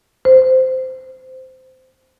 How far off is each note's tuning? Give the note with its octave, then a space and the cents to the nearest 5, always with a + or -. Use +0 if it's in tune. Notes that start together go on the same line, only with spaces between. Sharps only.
C5 -15